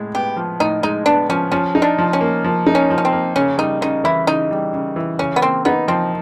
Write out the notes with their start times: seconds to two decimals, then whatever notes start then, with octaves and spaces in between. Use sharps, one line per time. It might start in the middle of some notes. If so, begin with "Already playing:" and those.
Already playing: A2 G#3
0.15 B3 G4
0.37 F3
0.60 A2 D#4
0.83 G#3 D#4
1.06 B3 D4
1.29 F3 C#4
1.52 F3 C#4
1.75 D#4
1.82 D4
1.99 F3
2.13 C#4
2.21 A#3
2.44 F3
2.67 D#4
2.75 C#4
2.90 F3
2.98 C#4
3.05 C4
3.12 A#3
3.36 C#3 C#4
3.58 G3 D#4
3.81 C#3 D#4
4.04 E3 E4
4.27 C#3 D#4
4.51 G3
4.73 C#3
4.96 E3
5.19 C#3 C#4
5.36 B3
5.42 A#3 C4
5.65 B3 D#4
5.88 F3 C4